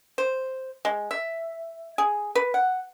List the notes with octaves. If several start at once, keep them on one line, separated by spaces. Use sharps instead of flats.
C5
G#3
E5
G#4
B4
F#5